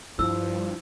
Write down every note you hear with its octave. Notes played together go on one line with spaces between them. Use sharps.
G2 F3 E4 E6